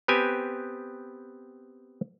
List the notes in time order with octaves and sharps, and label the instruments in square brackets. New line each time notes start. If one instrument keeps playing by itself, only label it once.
[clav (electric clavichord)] B3 C4 G4 B4 G#5